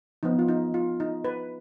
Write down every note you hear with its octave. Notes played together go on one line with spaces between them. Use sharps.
F3 B3 D#4
F4
D#4
F4
D#4
B4